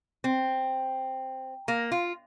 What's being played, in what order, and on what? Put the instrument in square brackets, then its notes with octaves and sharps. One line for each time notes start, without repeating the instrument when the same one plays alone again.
[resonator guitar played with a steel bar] C4
A#3
F4